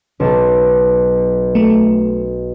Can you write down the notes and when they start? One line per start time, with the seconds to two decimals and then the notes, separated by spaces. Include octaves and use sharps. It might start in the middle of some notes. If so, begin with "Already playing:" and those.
0.20 B1 C#5 A5
1.55 A3